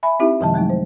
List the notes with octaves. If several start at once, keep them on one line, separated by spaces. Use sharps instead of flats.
E5 G#5 B5
C4 D#4 E4 G4 E5
F#2 C3 D#3 F3 G#3 A5
F#3 G#3 A3 D#4
C5